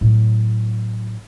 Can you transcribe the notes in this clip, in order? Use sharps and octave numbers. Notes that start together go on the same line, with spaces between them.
A2 F#3